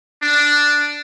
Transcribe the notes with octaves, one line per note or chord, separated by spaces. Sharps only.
D4